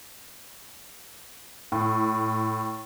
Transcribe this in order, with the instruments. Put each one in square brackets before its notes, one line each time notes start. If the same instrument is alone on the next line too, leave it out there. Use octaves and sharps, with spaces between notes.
[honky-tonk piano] A2